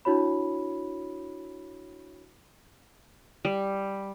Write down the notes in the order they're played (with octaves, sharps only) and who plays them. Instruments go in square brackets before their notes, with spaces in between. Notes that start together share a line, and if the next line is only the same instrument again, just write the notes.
[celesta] D4 E4 F#4 C#5 B5
[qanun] G3